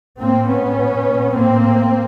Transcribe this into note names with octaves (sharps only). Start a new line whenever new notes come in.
A2 A#3 C4
A2 B3 C#4
A#2
A#2
A2 A#3 C4
A2